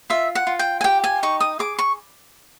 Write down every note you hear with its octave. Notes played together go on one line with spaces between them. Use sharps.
F4 E5
F#5
F4
G5
G#5
G4 G5
G#5
D#4 C#6
D#6
G#4 D6
C#6